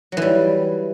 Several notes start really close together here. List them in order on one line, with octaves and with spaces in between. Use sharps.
F#3 E3 G3